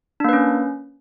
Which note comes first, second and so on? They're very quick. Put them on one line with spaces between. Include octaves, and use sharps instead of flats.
D4 A#3 B4 C#4